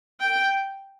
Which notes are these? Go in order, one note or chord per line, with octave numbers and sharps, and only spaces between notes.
G5